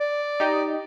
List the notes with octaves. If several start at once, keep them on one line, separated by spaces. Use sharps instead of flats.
D5
D#4 G4 D#5